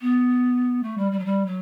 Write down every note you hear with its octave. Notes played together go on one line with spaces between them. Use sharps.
B3
A3
G3
G3
F#3
G3
F#3